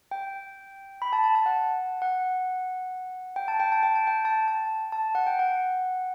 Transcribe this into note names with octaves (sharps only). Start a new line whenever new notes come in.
G5
B5
A5
A5
A5
F#5
F#5
G5
A5
G5
A5
G5
A5
G5
A5
A5
A5
F#5
G5
F#5